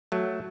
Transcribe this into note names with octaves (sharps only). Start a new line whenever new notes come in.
F#3 A3